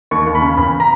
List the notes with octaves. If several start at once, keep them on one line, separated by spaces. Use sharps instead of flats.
D#2 C#6
D#2
B5
C#3
E2 B5
A#5